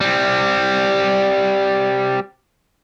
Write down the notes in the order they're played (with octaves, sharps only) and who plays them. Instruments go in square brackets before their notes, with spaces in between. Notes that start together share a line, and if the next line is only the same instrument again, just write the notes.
[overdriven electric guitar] G3 C4